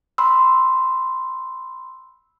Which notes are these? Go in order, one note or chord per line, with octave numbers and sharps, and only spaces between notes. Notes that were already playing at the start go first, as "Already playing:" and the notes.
B5 C6 E6